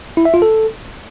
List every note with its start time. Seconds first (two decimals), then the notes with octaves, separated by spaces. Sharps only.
0.17 E4
0.25 E5
0.34 F4
0.42 A4